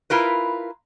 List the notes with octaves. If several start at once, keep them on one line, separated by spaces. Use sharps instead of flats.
E4 F4 A#4 B4